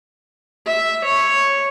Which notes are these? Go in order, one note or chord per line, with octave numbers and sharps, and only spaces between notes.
E5
C#5